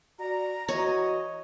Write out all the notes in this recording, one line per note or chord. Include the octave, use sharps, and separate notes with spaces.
F#4 D5 A#5
E3 F#4 C#5 D#5